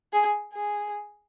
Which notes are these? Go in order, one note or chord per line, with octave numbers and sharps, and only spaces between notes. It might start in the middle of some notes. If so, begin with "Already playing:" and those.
G#4
G#4